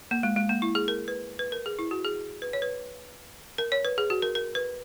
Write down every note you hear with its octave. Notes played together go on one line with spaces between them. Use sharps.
A#3
G#3
G#3
A#3
E4
G#4
A#4
B4
B4
A#4
G#4
E4
F#4
G#4
B4
C#5
B4
A#4
C#5
B4
G#4
F#4
A#4
A#4
B4